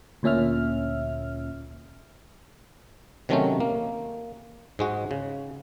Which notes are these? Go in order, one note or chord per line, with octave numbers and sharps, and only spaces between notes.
D2 A#2 C#4 E5 F6
C3 D#3 F#3 A3 C4 C#4
A#3
G#2 G#3 F#4
C#3